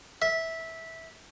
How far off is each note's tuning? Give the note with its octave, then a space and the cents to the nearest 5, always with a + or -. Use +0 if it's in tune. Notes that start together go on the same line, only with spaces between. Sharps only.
E5 -15